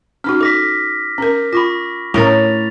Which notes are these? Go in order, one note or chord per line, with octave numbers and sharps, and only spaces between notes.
C#4 D#4 F#4 F6
A4 D6 A#6 B6
C#4 A#4
F4 B5 C#6 A#6
A2 C#4 A#4 A6 F7